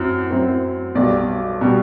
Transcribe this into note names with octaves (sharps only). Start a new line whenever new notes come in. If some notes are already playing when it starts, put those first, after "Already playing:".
Already playing: F#2 F#3 C4 E4
F#2 F#3 C4 E4
B1 B2 G3 D5
B2 G3